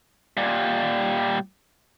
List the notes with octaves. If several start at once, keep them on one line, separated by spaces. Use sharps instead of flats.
A#2 G3